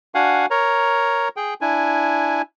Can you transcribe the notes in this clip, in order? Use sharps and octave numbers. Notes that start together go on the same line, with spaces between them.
D4 F#4 F5 F#5 G#5
A#4 C#5 A#5
G#4 G5
D4 E4 G#5